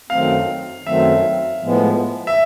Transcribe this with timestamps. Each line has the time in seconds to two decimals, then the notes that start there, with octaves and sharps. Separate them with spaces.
0.10 F#2 D#3 F#3 A3 C4 F5
0.85 F#2 D#3 F#3 A3 C4 E5
1.62 A2 F3 G#3 B3
2.27 E5